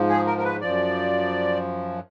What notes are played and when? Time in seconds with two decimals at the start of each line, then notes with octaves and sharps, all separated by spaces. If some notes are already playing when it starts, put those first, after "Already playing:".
Already playing: G#2 F3
0.09 G#4
0.26 A#4
0.38 A#4
0.44 B4
0.61 F#2 F3 D5